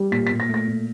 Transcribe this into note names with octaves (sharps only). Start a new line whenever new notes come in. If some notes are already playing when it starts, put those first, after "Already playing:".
Already playing: G3
A#2 B6
A#2 B6
A#6
A3
A#6
A#2